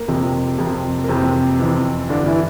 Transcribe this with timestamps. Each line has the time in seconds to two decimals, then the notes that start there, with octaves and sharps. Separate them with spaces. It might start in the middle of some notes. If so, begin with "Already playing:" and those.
Already playing: A#3
0.08 F2 C3 F3
0.58 F2 C3 F3
1.04 A#3
1.08 F2 C3 E3 C4
1.59 F2 E3
2.09 G2 D3 E3 D4
2.26 E3 E4